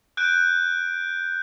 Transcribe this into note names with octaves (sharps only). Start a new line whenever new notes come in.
F#6 G6 D7